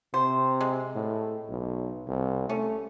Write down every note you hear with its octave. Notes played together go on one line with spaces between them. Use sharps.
C3 C5
G#3
A2
B1
C2
A3 C#4